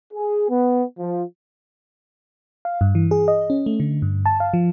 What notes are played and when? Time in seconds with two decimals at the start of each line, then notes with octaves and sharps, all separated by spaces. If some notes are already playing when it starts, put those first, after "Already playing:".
0.13 G#4
0.49 B3
0.98 F3
2.65 F5
2.81 G2
2.95 E3
3.11 G#4
3.28 D#5
3.50 C#4
3.66 A3
3.80 D3
4.02 G2
4.26 A5
4.40 F5
4.54 F3